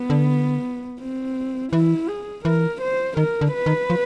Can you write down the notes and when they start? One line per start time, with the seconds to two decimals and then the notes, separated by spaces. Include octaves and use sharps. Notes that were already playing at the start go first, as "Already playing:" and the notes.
Already playing: B3
0.10 D3
1.01 C4
1.73 E3 E4
2.08 G#4
2.45 E3 A#4
2.81 C5
3.17 D#3 A#4
3.41 D3
3.54 B4
3.66 D#3
3.90 F3